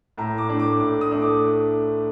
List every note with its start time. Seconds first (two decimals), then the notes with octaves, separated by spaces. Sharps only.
0.18 A2 A#5
0.38 D6
0.48 A3 D4
0.60 D6
0.80 A2 D6
1.01 D#6
1.11 A3 D4
1.22 D6